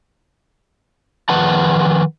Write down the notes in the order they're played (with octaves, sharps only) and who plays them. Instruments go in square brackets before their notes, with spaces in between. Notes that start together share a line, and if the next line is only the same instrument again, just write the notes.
[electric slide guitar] D#3 F3 B4 F#5 A5